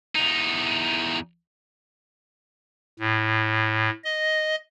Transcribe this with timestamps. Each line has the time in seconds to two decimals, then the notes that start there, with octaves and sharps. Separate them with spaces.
0.16 E2 D#4
3.00 A2
4.04 D#5